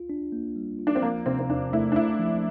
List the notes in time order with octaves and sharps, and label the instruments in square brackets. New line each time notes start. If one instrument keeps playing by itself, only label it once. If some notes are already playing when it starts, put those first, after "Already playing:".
Already playing: [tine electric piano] F4
D4
A#3
G3
F4
[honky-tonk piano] D4
C4
[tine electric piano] F3 [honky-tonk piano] A#3
[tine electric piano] C3 [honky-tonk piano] C4
[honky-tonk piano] C4
[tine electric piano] E2 [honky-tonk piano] D4
[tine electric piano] A3 [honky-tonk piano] E4
[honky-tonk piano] D4
[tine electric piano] A3 [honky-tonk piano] E4
[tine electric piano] F3